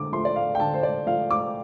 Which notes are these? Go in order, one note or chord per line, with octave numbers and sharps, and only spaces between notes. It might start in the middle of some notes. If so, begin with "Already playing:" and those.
Already playing: D3 D6
F3 A3 C6
D5
F5
G5
D3 A5
C5
D5
F3 A3 F5
D6